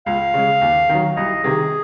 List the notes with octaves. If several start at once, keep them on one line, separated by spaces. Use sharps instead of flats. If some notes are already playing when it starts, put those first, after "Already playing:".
C#2 F5
C#3 G#3
D#2
D#3 F#3
C2 D#5
C3 D#3 G#4